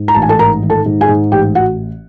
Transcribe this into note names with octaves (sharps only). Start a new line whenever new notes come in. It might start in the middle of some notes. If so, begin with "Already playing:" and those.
Already playing: G#2
A#5
A1 A5
G#5
A4 A5
G#2 A#4 A#5
D#3
A4 A5
G#2
G#4 G#5
G#2
A1 G4 G5
F#4 F#5